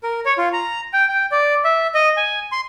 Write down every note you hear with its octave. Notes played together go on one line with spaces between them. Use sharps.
A#4
C#5
F4
A#5
G5
G5
D5
E5
D#5
G#5
C6